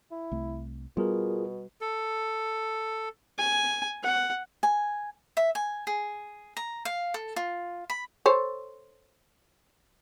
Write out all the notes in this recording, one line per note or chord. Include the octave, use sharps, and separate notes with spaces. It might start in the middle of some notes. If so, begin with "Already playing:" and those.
E4
C2 A3
B2 G3 B3 F4 G#4 A#4
A4
G#5
F#5
G#5
E5
G#5
G#4
A#5
F5
A4
F4
B5
A4 C5 C#5